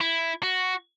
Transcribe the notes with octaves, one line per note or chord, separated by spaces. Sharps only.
E4
F#4